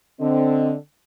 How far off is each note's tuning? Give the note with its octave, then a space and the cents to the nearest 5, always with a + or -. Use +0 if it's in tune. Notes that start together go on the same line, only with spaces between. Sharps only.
D3 +0 C4 +0 D#5 +0